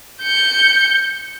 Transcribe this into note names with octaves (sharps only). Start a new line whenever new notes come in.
G6 C#7